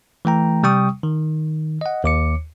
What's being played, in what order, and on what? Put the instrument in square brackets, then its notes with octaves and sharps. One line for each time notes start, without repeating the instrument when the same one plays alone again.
[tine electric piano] E3 A3 G5 A#5
C3 G3 G5 C#6 D#6
D#3
D#5 F#5
D#2 D6 C#7